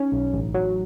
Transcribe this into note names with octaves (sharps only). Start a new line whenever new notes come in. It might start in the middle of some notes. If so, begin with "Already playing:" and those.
Already playing: C#4 D#4
B1
A1
F#3